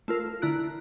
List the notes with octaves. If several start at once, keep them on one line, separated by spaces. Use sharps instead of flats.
A3 F4 A#4
D3 E4 A#5 F#6 D7